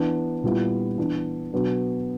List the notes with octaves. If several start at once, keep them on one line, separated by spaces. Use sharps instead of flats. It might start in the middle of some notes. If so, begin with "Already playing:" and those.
Already playing: E3 B3 D4
A#2 G3 B3 E4
E3 B3 D4
B2 F#3 B3 D4